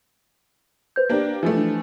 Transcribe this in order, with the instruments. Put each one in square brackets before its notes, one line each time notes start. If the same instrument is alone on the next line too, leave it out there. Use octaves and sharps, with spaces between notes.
[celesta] B4 C5 G6
[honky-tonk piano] A#3 D4 G4
E3 F3 A3
[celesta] D4